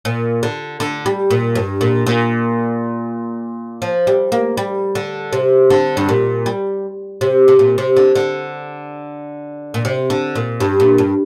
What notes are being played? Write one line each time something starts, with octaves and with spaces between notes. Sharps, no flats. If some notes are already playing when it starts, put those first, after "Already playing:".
A#2
D3
D3
G3
A#2
G2
A#2
A#2
F3
G3
A#3
G3
D3
C3
D3
G2
A#2
G3
C3
C3
A#2
C3
D3
D3
A#2
C3
D3
A#2
G2
A#2
G2